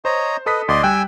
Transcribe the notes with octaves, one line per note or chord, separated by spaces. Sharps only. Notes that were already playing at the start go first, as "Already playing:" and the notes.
C5 C#5 D#5 A#5
A4 B4 D#5 D#6 B6
D2 D5 D#5 C6
G3 G5 G#5 E6 F#6